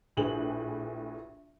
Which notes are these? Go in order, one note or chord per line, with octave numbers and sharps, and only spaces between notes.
A#1 A2 G4 G#4 B4 F#7